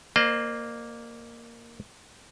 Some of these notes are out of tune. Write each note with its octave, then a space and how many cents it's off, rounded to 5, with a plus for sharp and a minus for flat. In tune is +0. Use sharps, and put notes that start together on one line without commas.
A#3 +0 C5 +0 D#5 -45